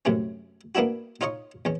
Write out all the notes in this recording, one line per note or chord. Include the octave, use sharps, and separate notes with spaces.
F#2 A2 C3 C#4
A#3 B3 D4 E4 F#4
D#4 F4 C#5 D#5 C#6
E2 C#4